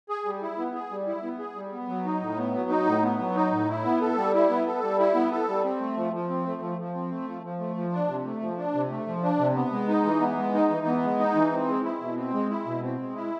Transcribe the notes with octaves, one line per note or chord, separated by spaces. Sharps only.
G#4
G3
E4
B3
G#4
G3
E4
B3
G#4
G3
B3
F#3
D#4
A2
B3
F#3
D#4
A2
B3
F#3
D#4
A2
E4
B3
A4
G3
E4
B3
A4
G3
E4
B3
A4
G3
C4
A3
F3
F3
C4
A3
F3
F3
C4
A3
F3
F3
A3
F3
D4
C3
A3
F3
D4
C3
A3
F3
D4
C3
B3
G#3
D#4
E3
B3
G#3
D#4
E3
B3
G#3
D#4
E3
C4
G#3
E4
B2
C4
G#3
E4
B2
C4
G#3
E4